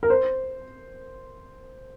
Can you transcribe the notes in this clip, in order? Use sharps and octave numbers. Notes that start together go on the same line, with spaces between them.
A#4
C5